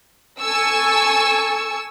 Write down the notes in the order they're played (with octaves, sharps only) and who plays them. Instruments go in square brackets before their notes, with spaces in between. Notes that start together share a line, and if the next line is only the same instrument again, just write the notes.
[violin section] A4 G#5 C#6 E6